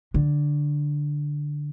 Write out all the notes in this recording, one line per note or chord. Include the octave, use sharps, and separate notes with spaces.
D3